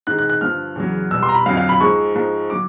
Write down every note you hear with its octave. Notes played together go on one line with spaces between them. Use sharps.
G#2 D#3 G#3 F#6
F#6
F#6
G2 D3 F3 F6
E2 C#3 F#3
B2 G3 E6
C6
A#5
B5
F2 D3 F#3 F5
F5
B5
G#2 F3 G#3 C#6
G#2 F3 G#3
D3 F#3 D6